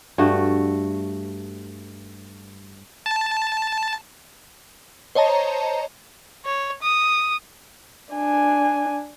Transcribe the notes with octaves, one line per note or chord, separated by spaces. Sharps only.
G2 A3 F#4
A5
C5 C#5 D#5 A5 A#5
C#5
D#6
D4 G#5